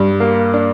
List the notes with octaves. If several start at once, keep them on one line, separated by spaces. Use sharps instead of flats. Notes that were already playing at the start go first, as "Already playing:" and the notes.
Already playing: G2
A#3
D4